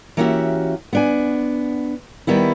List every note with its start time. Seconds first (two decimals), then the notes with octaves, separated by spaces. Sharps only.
0.17 E3 A#3 C#4 F#4 G4 E5
0.93 B3 D4 G#5
2.27 D#3 G3 B3 E4